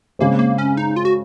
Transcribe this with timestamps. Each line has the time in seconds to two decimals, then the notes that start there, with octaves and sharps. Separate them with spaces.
0.19 C#3 G#3 A#3 C4
0.39 A#3
0.58 C#4
0.77 D#4
0.96 F4
1.05 F#4